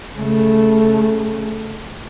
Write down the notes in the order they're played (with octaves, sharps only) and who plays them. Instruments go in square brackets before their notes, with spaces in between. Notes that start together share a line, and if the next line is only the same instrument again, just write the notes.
[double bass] C#3 A3